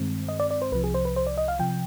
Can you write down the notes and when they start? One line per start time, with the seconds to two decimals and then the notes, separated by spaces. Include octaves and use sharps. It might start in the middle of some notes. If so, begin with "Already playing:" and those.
Already playing: G2 D#3 G#3 C4
0.28 D#5
0.40 D5
0.51 D5
0.62 C5
0.72 C2 C3 F3 B4
0.84 G#4
0.94 C5
1.05 B4
1.16 C5
1.27 D5
1.38 D#5
1.48 F5
1.59 C3 F3 G5